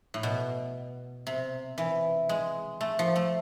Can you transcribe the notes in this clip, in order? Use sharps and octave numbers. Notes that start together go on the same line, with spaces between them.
A2
B2
C3
E3
G#3
A3
F3
A3